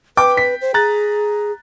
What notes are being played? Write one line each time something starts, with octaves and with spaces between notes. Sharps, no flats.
B4 G5 D6
B6
C5
G#4 A#5 F#6 A6